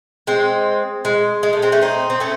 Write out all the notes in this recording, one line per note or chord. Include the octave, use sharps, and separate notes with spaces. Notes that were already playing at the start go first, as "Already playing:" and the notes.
G#3 C4
G#3
G#3
A3
G#3 C4
A3 C#4
C4 D#4
C4
A3 C#4